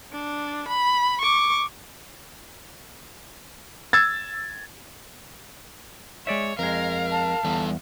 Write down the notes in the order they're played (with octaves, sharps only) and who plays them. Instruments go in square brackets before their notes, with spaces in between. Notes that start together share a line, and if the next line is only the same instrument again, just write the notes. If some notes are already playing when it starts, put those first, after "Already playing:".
[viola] D4
B5
C#6 D6
[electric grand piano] E6 G#6 A6
[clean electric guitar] G#3 D5 E5 [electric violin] C#5
[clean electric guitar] F2 G#3 [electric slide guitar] A#4 [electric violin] F5
[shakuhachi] A5
[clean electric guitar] E2 [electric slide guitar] G3 A4